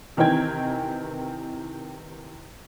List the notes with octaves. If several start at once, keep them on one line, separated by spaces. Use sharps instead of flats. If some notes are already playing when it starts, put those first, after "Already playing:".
C3 D#3 E3 C4 G5 G#6